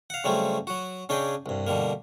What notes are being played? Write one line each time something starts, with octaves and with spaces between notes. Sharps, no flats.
F5 F#5
C#3 F#3 G3 A3 C4 C#4
F#3 F#4
C#3 C#4 D4 G#4 D#5 G5
C2 G2
B2 D3 G3 A#3